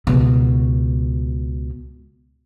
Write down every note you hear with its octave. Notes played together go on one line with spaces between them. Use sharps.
C#2 B2